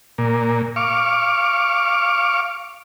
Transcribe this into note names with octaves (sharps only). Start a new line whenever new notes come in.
A#2
F5 C#6 D6